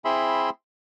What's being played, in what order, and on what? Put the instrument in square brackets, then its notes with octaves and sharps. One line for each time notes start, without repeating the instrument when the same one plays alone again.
[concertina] C4 E4 G#4 E5 B5 C6